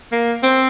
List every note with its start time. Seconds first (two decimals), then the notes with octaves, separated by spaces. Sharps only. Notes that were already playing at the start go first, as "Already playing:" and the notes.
0.12 A#3
0.43 C4